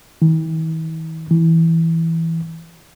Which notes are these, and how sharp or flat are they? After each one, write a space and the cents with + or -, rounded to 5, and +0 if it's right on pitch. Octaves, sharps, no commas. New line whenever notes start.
E3 -45
E3 -5